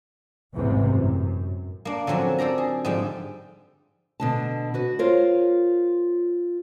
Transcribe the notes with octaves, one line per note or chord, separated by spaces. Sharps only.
A1 E2 G#2 C3 E3
F#2
A#3 D4
D3 F3 F#3 C4 C#4
A4 C5 D5 A#5
G#4
G#2 D3 F3 G3 G5
B2 D3 A5
F#4 B4
F4 A#4 C5 C#5 F5